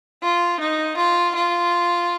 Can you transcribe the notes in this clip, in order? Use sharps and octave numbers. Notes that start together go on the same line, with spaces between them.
F4
D#4
F4
F4